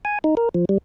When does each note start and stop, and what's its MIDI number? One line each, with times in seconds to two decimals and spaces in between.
0.05 0.19 80
0.24 0.35 63
0.37 0.49 70
0.54 0.65 53
0.69 0.78 55